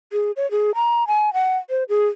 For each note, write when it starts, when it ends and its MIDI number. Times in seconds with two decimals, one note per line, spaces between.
0.13 0.32 68
0.36 0.50 73
0.51 0.71 68
0.75 1.07 82
1.07 1.33 80
1.34 1.57 78
1.70 1.84 72
1.89 2.07 68